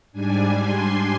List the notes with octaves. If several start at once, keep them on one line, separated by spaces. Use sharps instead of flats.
G#2 G3 D4 G#5
C6